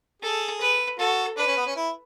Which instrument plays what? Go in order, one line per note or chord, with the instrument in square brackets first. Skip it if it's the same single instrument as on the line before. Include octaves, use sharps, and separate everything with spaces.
[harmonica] G#4 [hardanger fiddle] A4
[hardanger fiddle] B4
[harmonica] F#4 [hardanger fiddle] A4
[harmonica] D4 [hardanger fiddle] B4
[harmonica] C#4
B3
C#4
E4